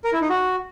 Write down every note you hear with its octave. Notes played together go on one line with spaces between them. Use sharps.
A#4
E4
D#4
F#4